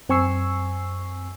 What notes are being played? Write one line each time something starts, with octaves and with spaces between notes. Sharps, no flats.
F#2 C4 G#5 C#6 E6 C7